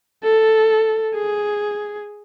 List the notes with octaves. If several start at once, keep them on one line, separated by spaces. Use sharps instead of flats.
A4
G#4